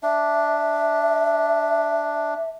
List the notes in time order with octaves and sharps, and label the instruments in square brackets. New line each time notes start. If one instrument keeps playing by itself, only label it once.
[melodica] D4 [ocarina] E5